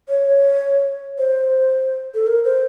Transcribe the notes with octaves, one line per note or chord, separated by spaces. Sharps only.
C#5
C5
A4
A#4
C5